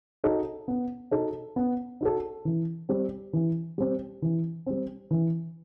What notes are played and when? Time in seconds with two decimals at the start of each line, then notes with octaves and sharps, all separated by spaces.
0.24 D#4 F#4 A4
0.68 B3
1.11 D#4 F#4 A4
1.56 B3
2.01 D#4 F#4 A4
2.45 E3
2.89 G3 C4
3.33 E3
3.78 G3 C4
4.22 E3
4.66 G3 C4
5.11 E3